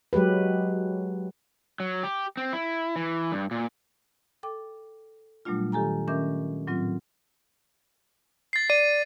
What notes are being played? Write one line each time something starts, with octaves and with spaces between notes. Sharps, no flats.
F#3 G#3 G4 B4
F#3
G4
C4
E4
E3
G2
A#2
A4 G5 D6
A#2 F#3 G3 A3 D4 F4
D#3 G4 A4 G#5 A#5
D#3 C#4 A#4 E5 D6 G6
A2 F#3 C4 F4
A6 C7
D5 D#7